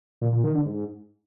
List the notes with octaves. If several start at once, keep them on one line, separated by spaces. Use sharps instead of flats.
A#2
A#2
D#3
D3
G#2